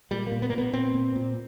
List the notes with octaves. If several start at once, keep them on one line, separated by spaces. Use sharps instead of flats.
A#2 G3
A#3
A#2
B3
A#3
A#2 B3
A#2 C4
A#2
A#2